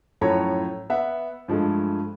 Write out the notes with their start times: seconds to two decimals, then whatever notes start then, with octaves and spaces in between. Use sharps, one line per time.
0.21 F#2 A2 F3 A4 C#5 A#5
0.90 B3 E5 F#5
1.48 G2 F3 G#3 A3